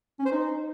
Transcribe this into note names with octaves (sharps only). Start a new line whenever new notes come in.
C#4
C5
D#4